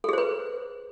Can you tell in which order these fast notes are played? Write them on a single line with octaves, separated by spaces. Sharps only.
A4 G#4 C5 B4